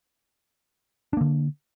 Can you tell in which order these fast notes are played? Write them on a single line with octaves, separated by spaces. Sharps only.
D4 A#3 D3